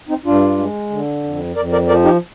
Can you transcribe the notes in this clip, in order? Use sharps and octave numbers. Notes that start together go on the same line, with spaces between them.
C4 D#4
G2 D4 F4
G#3
D3
F2
F2 A#4 D5
A#4 D5
F3 A#4 D5
D#4 G4